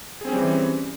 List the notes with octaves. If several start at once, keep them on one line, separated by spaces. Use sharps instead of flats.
E3 G3 C4 C#4 G#4